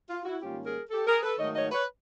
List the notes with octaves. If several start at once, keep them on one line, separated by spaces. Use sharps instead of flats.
F4
E4 F#4
G#2 D#3 G3 A#3 C#4 F4 G4
G#4 A#4
G4 A4
G#4 A#4
A4 B4
G#2 D#3 F#3 A3 C#5 D#5
C#5 D#5
B4 C#5